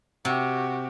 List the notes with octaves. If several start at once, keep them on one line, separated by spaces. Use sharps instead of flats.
C3 F#4 G4